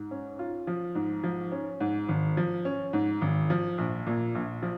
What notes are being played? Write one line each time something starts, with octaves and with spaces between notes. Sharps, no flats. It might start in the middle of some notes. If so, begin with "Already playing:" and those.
Already playing: G#2
C#4
F4
F3
G#2
F3
C#4
G#2
G#1
F3
C#4
G#2
G#1
F3
A#1
A#2
A#1
F3